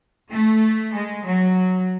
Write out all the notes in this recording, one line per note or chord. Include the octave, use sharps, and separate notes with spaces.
A3
G#3
F#3